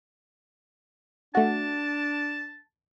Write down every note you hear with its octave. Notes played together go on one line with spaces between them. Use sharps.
A3 D4 F#4 F#5 A5